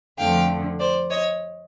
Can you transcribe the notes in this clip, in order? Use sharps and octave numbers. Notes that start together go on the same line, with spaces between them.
F2 D3 F3 A3 F5 G5
C5 D5
C#5 D#5